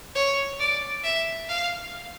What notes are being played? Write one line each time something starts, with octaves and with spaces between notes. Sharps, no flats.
C#5
D5
E5
F5